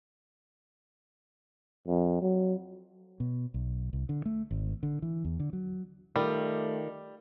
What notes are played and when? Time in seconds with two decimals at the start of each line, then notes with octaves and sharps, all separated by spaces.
1.87 F2
2.21 F#3
3.20 B2
3.54 B1
3.93 C2
4.09 D3
4.25 A3
4.51 G#1
4.83 D3
5.02 E3
5.24 E2
5.40 D3
5.53 F#3
6.16 D#3 G3 A3 F4